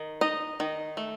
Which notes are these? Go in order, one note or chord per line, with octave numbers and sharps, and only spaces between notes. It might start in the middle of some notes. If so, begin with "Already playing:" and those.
Already playing: D#3
D#4 D#5
D#3
A3